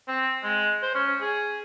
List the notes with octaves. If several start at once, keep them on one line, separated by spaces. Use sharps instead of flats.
C4
G#3
C5
C#4
G#4